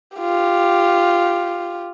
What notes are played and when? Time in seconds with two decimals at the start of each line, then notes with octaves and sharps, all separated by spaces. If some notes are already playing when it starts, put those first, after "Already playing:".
0.17 F4 G4